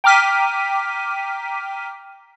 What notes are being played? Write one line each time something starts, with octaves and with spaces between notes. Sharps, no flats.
G5 A#5 D6 F6 B6 D#7